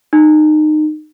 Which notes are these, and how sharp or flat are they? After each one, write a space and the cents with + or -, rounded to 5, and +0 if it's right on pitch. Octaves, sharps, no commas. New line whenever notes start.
D#4 -25